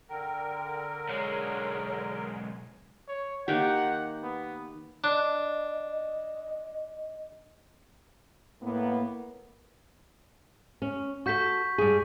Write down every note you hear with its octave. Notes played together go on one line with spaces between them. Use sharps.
D3 A#4 G5
B1 G#3 C#5
C#5
D#3 A#3 G4 F#5
B3
D4 D#5
A2 A#3 B3
C#4
F#4 A4 C#6 G6 B6
G2 G#4